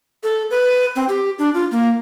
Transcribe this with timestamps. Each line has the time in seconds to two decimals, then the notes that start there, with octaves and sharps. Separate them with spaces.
0.23 A4
0.51 B4
0.96 C4
1.09 G4
1.39 D4
1.54 F4
1.71 A#3